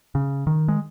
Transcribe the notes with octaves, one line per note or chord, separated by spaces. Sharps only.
C#3
D#3
G#3